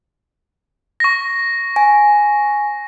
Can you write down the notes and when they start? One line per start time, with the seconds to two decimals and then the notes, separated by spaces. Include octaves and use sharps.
1.00 C#6 A#6
1.76 G#5